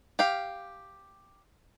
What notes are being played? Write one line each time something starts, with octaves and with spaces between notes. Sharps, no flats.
G4 F5